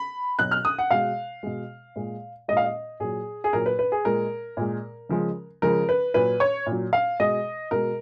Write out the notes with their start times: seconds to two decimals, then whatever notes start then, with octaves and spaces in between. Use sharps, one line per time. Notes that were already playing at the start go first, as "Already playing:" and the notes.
Already playing: B5
0.39 B2 F#3 F#6
0.51 F6
0.65 D#6
0.79 F#5
0.91 B2 G#3 F5
1.43 B2 G#3
1.96 A#2 G#3
2.48 A#2 G#3 D#5
2.57 F5
2.64 D#5
3.00 A#2 F#3 G#4
3.44 G#4
3.53 A#2 F#3 A#4
3.66 B4
3.79 B4
3.92 G#4
4.05 A#2 G#3 A#4
4.57 A#2 G#3
5.09 C#3 F3 G#3
5.62 C#3 F3 G#3 A#4
5.89 B4
6.14 A#2 F#3 B4
6.40 C#5
6.66 A#2
6.72 F#3
6.93 F5
7.20 B2 G#3 D#5
7.71 B2 G#3 A#4